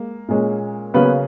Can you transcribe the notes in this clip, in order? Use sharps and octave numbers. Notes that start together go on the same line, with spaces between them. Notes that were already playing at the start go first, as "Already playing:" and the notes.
Already playing: G#3 A#3
A#2 G#3 C#4
C#3 F#3 A#3 B3 C#4 B4